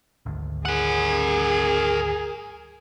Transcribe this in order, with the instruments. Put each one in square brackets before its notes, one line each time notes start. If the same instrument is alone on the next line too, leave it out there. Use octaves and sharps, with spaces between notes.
[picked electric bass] G#1 D2
[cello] G#4 [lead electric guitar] A#4 F#5